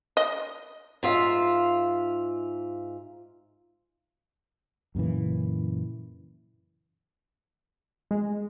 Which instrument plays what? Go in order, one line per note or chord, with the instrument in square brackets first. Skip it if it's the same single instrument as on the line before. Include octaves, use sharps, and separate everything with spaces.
[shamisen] D#5
[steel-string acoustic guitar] G#2 F4 E5
[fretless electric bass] F#2 A#2 C#3 E3
[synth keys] G#3